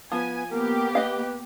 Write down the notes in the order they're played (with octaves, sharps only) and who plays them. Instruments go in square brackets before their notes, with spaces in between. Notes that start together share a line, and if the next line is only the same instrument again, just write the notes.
[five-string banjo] F3 [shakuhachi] B3 [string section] G#5
[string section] A#3 B3 G4 [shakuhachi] A#4
[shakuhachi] B4 [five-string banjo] D#5 F5